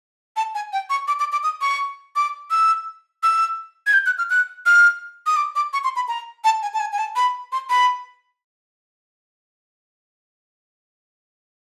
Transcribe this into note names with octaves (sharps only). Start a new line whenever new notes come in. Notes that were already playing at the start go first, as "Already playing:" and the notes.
A5
G#5
G5
C#6
D6
D6
D6
D#6
C#6
D6
E6
E6
G#6
G6
F#6
F6
F#6
F6
D#6
D6
D6
C#6
C6
B5
A#5
A5
G#5
A5
G#5
G#5
A5
B5
C6
B5